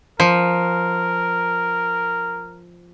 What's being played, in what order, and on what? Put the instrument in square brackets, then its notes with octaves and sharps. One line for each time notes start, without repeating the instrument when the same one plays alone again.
[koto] F3 [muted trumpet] A#4